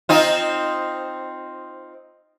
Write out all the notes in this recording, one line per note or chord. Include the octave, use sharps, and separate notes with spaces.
C4 D#4 F4